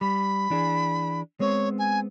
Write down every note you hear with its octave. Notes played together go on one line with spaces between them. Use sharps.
G3 B5
E3 D4 G#4
G#3 B3 C4 C#5
G#5